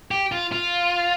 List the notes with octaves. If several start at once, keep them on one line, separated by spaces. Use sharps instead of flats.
G4
F4
F4